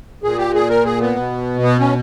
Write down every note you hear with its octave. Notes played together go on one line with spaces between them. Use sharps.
A#2 G#4
G4
G#4
A#4
G#4
B3
B2
B3
C#4